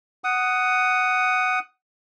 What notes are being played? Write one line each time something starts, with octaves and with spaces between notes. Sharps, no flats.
F#5 D#6